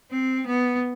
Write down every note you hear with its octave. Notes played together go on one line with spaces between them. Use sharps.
C4
B3